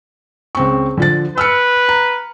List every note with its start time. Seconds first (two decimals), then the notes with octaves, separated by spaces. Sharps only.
0.55 C#2 C4 C#6
0.97 D3 F3 A6
1.38 B4 E6 F6 C#7
1.89 A#5